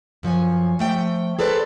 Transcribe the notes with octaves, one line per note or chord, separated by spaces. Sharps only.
F#2 F3 C#5 G#5
F3 A3 G5
G#4 A4 B4 C5 D5